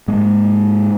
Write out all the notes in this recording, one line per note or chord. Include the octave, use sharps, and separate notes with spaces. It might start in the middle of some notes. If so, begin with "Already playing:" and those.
G#2 G#3 A#3